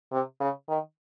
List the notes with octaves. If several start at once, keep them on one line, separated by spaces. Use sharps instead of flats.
C3
C#3
D#3